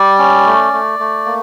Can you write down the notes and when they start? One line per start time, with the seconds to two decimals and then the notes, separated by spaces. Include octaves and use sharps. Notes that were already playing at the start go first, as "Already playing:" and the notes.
Already playing: G3 D5
0.18 C#4
0.46 A3
0.73 A3
0.99 A3
1.26 A#3